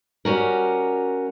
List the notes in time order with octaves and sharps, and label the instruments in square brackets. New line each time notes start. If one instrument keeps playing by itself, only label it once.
[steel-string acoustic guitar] G3 C#4 F#4 A#4